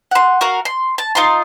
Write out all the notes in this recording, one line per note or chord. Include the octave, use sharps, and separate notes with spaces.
F#5 C6
F#4 A#4 F5
C6
A5
D#4 F4 A#5 C6